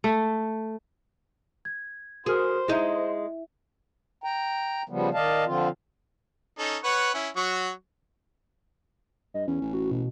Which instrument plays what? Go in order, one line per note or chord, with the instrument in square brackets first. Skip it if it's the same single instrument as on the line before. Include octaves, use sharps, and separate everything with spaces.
[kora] A3
[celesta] G#6
[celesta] F#4 A#4 F6 [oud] G#4 [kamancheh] C5
[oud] G#3 D#4 [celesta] E4 E5
[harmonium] G5 A#5
C#3 F3 G3 B3
D#3 D5 D#5 F5 A5
D3 F3 C4 F4
[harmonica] C#4 D#4 A4
B4 C#5 F#5
C#4 E4
F#3 F#4 C#6
[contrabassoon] G2 [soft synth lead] D#5
[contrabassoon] E2 [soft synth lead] C#4
[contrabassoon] A1
[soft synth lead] F#4
B2